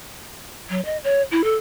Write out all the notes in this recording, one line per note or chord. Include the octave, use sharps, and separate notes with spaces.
F#3
D#5
C#5
E4
A4